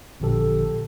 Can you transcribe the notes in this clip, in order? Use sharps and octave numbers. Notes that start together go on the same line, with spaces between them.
A1 A#2 D3 F3 G4 A4